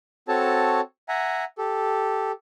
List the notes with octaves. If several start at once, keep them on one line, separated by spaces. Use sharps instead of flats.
C4 F#4 A4 C#5 A5
E5 F#5 G#5 A#5
G4 A4